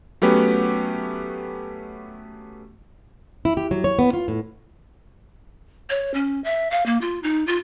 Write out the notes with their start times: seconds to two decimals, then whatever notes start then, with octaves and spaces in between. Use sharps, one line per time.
0.22 F#3 A3 B3 C#4 G4 B4
3.45 E4
3.57 G4
3.71 F#3
3.84 C#5
3.99 B3
4.13 F4
4.28 A2
5.90 C#5
6.14 C#4
6.44 E5
6.71 F5
6.86 A#3
7.01 F4
7.23 D#4
7.47 F4